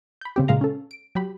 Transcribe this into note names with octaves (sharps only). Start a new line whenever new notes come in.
B5 G6
C#3 C4 G4
A#2 C#3 G#3 F5 A#5
C#4 A4
D7
F#3 G4 B5